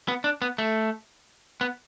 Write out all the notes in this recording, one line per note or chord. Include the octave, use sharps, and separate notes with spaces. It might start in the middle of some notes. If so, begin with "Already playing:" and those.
B3
D4
B3
A3
B3